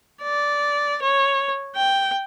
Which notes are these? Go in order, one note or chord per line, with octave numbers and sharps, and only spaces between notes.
D5
C#5
G5